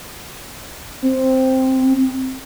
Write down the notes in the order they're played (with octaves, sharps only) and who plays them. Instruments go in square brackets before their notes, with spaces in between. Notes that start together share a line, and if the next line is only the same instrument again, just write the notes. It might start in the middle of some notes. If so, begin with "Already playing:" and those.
[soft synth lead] C4